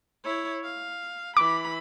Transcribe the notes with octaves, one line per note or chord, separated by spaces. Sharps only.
E4 C#5
F5
E3 B5 D6